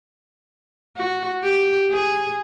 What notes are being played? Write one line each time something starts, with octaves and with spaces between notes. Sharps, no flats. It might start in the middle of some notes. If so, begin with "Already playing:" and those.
F#4
G4
G#4